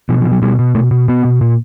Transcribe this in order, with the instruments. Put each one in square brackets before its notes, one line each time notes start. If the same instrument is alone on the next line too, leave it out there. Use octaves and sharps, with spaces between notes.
[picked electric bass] B2 F3
F3
B2
F#3
B2 G3
B2
B2 A3
B2
B2 B3
B2
A#2